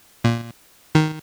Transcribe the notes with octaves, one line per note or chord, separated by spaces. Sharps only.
A#2
D#3